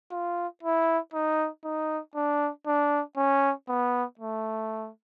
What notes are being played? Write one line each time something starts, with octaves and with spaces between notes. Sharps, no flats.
F4
E4
D#4
D#4
D4
D4
C#4
B3
A3